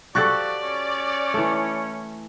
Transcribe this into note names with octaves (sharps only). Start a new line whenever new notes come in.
F3 F#4 G4 A4 D5 C#6 F#6 A6
C#4
E3 A3